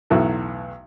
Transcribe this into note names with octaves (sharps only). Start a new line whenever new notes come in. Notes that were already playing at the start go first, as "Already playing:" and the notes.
B1 E2 A2 F#3 A3